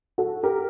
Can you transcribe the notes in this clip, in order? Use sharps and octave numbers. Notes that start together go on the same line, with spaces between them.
F#4 A4
G4 A#4